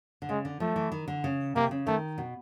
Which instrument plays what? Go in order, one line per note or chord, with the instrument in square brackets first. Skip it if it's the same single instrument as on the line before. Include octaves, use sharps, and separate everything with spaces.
[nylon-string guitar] D3
[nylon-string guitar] C#3 [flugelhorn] G#3
[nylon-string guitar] D3
[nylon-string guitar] F3 [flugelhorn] A3
[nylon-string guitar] E3
D#3
D3
C#3
[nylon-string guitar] C3 [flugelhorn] A#3
[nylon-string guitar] C#3
[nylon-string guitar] D#3 [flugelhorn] A3
[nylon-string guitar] B2